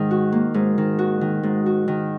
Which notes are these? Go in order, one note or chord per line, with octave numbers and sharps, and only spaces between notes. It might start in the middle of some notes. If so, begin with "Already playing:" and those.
Already playing: G#2 D#3
F#4
A#3
G#2
D#3
F#4
D#3
G#2
F#4
D#3